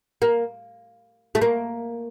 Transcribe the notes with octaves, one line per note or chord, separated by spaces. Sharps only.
A#3
A3
A#3